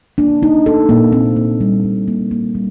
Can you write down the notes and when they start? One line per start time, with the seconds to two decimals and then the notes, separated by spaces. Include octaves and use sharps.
0.18 A#3 D4
0.42 A#3 D#4
0.66 A#3 A4
0.89 A#2 A#3
1.12 A#3 C4
1.36 A#3
1.61 G3
1.84 A#2
2.08 A#3
2.31 A#3
2.55 G3